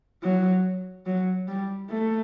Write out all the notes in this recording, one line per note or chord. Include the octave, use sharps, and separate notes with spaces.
F#3
F#3
G3
A3